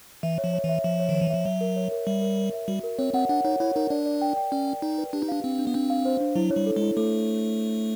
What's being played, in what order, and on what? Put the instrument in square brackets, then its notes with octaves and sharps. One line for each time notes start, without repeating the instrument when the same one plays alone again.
[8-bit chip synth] E3 [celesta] E5
[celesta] C#5
[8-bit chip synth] F3
[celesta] C#5
[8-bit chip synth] E3
[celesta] E5
[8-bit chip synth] F3 [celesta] E5
[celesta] C#5
[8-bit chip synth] D#3
[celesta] C#5
[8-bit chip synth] E3
[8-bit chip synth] F3 [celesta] E5
[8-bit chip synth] F#3 [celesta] E5
[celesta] A#4
C#5
A#4
[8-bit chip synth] G3 [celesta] E5
[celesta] A#4
A#4
E5
[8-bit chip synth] G3 [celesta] F#4
[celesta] A#4
[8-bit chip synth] C4 [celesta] C#5
[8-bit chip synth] C4 [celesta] F#5
[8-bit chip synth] D4 [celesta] F#5
[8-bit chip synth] D#4 [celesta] C#5
[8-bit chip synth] E4 [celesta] C#5
[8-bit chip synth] D#4 [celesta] A#4
[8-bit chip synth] D4 [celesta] D5
[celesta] D5
G5
G5
[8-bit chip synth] C#4 [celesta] D5
[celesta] G5
[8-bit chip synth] D#4 [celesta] D5
[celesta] B4
[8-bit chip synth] D4 [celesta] G4
[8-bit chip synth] D#4
[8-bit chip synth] D4 [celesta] F5
[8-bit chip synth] C4 [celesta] D4
[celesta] D4
[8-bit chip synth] B3
[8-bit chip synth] C4 [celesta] D4
[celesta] F5
C5
D4
[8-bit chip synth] F#3 [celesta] E4
[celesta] C#5
[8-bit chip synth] G3
[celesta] A4
[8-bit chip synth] G#3
[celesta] E4
[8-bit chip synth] A3 [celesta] A4